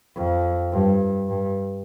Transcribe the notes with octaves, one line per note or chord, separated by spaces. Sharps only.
F2
G2
G2